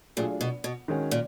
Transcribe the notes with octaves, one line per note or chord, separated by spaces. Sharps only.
A#2 F#3 A3 D4 F4 G#4
B2
B2
D#3 G#3 C#4 F#4
A#2